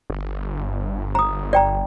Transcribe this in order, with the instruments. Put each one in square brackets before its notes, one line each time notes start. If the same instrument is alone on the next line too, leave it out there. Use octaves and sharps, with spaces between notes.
[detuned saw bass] G1
[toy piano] A#5 D#6
D5 G5 A#5